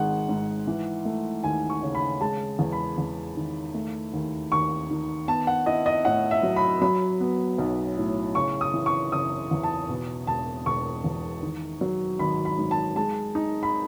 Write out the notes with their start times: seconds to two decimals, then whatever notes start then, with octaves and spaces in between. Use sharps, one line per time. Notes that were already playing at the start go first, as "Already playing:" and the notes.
Already playing: G#1 G#3 F#5
0.29 G#2
0.67 E3
1.05 A3
1.44 D#2 G#5
1.70 C#6
1.83 C#3
1.95 B5
2.21 G#3 A5
2.59 E2
2.72 B5
2.98 E2
3.37 D#3
3.74 A3
4.13 D#2
4.52 D#2 C#6
4.90 D#3
5.28 B3 A5
5.47 F#5
5.66 E4 D#5
5.86 D#5
6.05 A2 F#5
6.31 E5
6.43 F#3
6.56 B5
6.82 F#3 B5
7.21 B3
7.58 B1
7.97 A2
8.35 C#3 C#6
8.61 D#6
8.74 E3
8.86 C#6
9.12 F#1 D#6
9.51 E2
9.63 A5
9.89 B2
10.27 E1 A5
10.66 E1 C#6
11.04 E2
11.43 D#3
11.81 F#3
12.19 G#1 B5
12.45 B5
12.58 G#2
12.71 A5
12.96 G#3 A5
13.35 D#4
13.63 B5